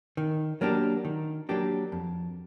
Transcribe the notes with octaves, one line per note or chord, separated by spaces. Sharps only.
D#3
F#3 A#3 D4 G4
D#3
F#3 A#3 D4 G4
F2